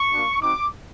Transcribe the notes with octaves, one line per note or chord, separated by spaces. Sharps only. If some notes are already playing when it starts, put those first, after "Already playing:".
Already playing: C#6
A#3 D4 F#4
C4 D#4 F#4 D6